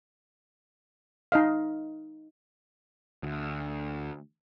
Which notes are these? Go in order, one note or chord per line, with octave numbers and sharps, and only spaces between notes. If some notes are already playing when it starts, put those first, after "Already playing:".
D#4 D#5 F5
D2